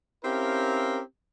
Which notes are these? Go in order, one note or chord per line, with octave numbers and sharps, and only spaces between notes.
C4 C#4 E4 G4 A#4 F5